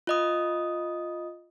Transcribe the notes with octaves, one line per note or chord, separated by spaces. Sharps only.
F4 D#5 D#6